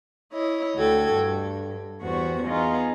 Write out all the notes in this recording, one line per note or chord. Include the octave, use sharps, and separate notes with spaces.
E4 C#5 D#5
D2 F#4 A4 G5 G#6
G2
E2 G3 B3 F#4 C5 C#6
B3 D#4 F4 G#4